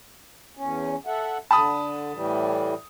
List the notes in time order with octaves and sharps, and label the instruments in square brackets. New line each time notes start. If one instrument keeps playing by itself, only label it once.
[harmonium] E2 C#4
A4 E5 F#5
[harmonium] D3 [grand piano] A5 B5 D#6
[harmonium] A2 E3 G3